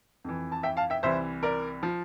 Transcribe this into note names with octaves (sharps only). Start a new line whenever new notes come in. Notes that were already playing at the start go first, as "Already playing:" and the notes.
F2 E3
A5
E5 G5
F5 A5
E5 G5
C2 C3 E3 C5 E5
A#4 D5
F3